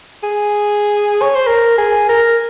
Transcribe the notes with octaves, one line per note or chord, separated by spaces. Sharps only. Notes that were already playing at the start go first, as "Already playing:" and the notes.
G#4
C#5
C5
A#4
G#4
A#4